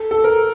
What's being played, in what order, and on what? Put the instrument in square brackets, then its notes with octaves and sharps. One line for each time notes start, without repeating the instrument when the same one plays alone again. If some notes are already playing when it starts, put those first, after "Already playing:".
Already playing: [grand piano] A4
A4
A#4